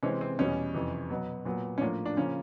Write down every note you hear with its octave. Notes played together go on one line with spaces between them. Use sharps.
C3 E3 G#3 C4 C#4
C4
E2 B2 G3 C#4
F2 C3 E3
B2 F#3 B3
A#2 F#3 B3
C#4
A2 F3 A#3 D4
D4
C#3 F3 A#3 C#4